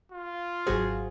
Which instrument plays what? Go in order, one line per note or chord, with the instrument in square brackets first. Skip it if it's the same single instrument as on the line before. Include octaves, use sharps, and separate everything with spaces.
[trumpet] F4
[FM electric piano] G#1 F#3 C5 [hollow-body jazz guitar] F#4 G#4